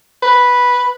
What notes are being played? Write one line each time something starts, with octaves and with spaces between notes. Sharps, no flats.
B4